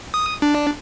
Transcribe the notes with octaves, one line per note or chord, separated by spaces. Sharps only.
D#6
D4